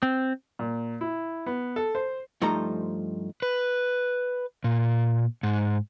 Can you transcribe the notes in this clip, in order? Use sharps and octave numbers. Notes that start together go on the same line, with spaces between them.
C4
A#2
E4
B3
A4
C5
G2 F3 A3 D#4 C5 A#5
B4
A#2
G#2